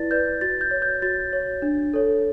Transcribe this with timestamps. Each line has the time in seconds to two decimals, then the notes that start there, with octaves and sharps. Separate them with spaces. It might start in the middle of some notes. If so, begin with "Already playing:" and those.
Already playing: E4 B4 D5 A6
0.11 B4 D5 G6
0.41 F#4 A6
0.61 G6
0.71 C#5
0.82 G6
1.02 F#4 A6
1.33 C#5
1.62 D4
1.94 A4 C#5